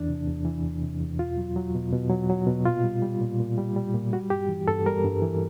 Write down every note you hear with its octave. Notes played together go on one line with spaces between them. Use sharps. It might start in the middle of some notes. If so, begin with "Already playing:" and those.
Already playing: E2 E3 D4
C3
E2
E3
E2
C3
E2
B2 F4
F#3
F#3
B2
B2
F#3
F#3
B2
A#2 F4
G3
G3
A#2
A#2
G3
G3
A#2
G3 F#4
G2 G4
E3
G2 A4
G3 A#4
G2
E3